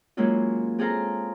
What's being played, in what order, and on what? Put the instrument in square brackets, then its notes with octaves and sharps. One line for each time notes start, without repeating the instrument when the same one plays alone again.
[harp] F#3 G#3 A#3 C#4 E4 F4
C4 G#4 A4 F5 A#5